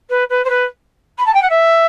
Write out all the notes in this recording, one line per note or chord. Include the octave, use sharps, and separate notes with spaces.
B4
B4
C5
B4
B5
A5
G5
F#5
E5